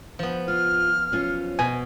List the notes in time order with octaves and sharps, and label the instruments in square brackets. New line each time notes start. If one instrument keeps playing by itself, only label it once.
[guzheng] F3 B3
[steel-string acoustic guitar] F4 [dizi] F6
[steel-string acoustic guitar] F#3 C#4 F4
[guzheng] B2 [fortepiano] G#5